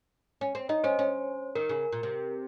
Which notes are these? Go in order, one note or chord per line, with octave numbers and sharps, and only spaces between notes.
C#4
C4
D#4 D#5
C#4 C5
C#4
D#3 A#4
C#3
A#2
C3